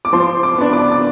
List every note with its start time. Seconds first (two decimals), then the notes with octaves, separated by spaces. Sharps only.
0.05 D6
0.13 F3 C6
0.43 D6
0.58 B3 D4
0.73 D6
0.92 D6